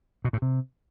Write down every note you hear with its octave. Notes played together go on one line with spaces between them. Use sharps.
B2
A2
C3